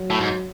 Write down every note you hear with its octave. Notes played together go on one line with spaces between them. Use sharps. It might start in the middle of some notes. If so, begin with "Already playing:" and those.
Already playing: F#3
A2
G#2